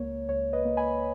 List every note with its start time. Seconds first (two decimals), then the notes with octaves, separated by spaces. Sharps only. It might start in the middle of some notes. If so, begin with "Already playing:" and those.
Already playing: C#2 A#3 C#5
0.29 C#2 C#5
0.53 B4 D#5
0.65 A#3
0.77 G#5 B5